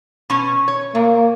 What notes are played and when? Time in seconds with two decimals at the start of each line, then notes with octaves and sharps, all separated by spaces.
0.30 B2 C#4
0.68 C#5
0.95 A#2 A#3